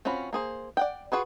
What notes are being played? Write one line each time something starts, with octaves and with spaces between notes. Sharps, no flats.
C4 C#4 F4 F#4 B5
A#3 G#4 C5
D5 F#5 G5
F4 F#4 G#4 B4